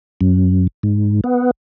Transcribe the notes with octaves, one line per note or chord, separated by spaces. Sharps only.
F#2
G#2
B3